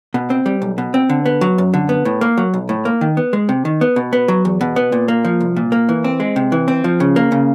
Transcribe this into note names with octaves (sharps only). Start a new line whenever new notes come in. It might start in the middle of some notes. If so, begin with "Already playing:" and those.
B2
C4
G3
B1
B2
C4
D3
B3
F#3
F#2
D3
B3
A2
A#3
F#3
B1
A2
A#3
D#3
B3
G#3
C3
D#3
B3
B2
B3
F#3
E2
B2
B3
A#2
A#3
F3
C2
A#2
A#3
E3
C4
G#3
C3
E3
C4
F3
C#3
A#3
C#3